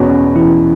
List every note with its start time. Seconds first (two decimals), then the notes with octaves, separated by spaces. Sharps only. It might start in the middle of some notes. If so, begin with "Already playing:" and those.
Already playing: E2 B2 B3 C#4 F#4 C#5
0.35 E3 E4